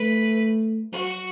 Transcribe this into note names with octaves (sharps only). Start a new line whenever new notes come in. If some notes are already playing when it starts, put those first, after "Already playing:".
Already playing: A3 B4
F#3 F#4